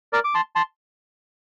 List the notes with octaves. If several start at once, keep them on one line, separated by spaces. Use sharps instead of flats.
A#4 D5
D6
A5 C6
A5 C6